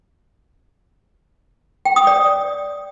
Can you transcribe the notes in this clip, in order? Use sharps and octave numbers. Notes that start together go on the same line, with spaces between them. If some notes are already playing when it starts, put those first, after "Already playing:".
G5
D#6
D5